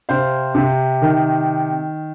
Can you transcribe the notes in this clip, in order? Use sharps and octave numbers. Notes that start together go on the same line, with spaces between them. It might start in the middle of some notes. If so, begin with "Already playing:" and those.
C3 C5 F5
C3
D#3